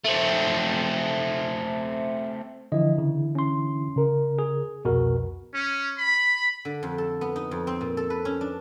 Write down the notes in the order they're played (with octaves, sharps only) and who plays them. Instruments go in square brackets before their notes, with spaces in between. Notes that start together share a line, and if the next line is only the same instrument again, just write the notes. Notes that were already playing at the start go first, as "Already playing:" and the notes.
[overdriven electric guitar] A3 C4
[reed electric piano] D3 E3 E4 [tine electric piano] F3 D#5
[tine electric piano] C#3
C#4 C6
[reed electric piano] C#3 A#4
[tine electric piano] G#4
[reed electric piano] C2 F2 [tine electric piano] B2 F#4 A#4
[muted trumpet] C#4
B5
[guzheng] D3
F2
A4
B3
D#4
F2
C4
A#2
A4
B4
C#4
D4